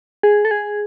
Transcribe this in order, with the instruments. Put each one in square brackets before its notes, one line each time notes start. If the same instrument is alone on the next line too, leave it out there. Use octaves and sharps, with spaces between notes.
[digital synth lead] G#4
A4
G#4